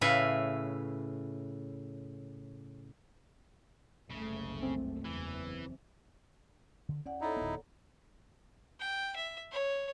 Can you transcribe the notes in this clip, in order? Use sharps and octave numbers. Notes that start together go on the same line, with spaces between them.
A2 C#3 B4 E5 F5
F#1 C2 C#3 A3
C4
F#1 E2 E3
D3
E2 C#4 D5 F#5
D#4 E4 A4 C#5 A#5
D1 B3
G5
E5
C#5